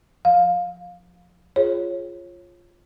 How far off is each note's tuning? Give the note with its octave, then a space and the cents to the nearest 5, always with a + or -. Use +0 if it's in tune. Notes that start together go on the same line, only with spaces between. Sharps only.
F3 +20 F5 +20
F4 +0 G#4 +0 C#5 -25